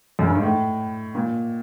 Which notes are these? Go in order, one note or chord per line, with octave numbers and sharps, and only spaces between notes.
F#2
G2
G#2
A2
A#2